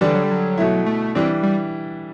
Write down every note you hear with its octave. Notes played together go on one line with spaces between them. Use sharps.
D3 E3 G3 D4
F#3
G3
F#3
B2 A3 E4
A3
E3 G3 C4 D4
G3